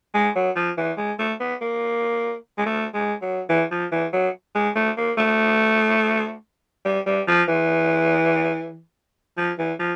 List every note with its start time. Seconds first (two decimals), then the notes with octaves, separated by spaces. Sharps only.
0.14 G#3
0.36 F#3
0.56 F3
0.78 E3
0.98 G#3
1.19 A3
1.40 B3
1.61 A#3
2.58 G#3
2.66 A3
2.94 G#3
3.22 F#3
3.49 E3
3.71 F3
3.92 E3
4.13 F#3
4.55 G#3
4.76 A3
4.97 A#3
5.18 A3
6.85 G3
7.06 G3
7.27 F3
7.48 E3
9.37 F3
9.59 E3
9.79 F3